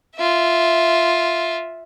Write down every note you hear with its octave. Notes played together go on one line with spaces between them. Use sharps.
F4 E5